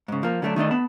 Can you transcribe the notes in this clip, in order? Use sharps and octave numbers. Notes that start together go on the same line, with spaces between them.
G#2 C#3
F3 A#3
D3 F#3 A3 C4 D4
D#3 A3 D4 D#5
B3 A5 B5